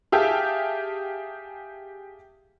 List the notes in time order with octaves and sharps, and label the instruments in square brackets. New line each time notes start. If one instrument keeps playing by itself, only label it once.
[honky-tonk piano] G4 G#4 E5 F5 G5 A5